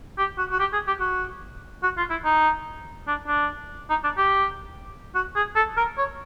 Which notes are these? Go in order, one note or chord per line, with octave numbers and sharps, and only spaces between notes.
G4
F#4
F#4
G4
G#4
G4
F#4
F#4
F4
E4
D#4
D4
D4
D#4
D4
G4
F#4
G#4
A4
A#4
C#5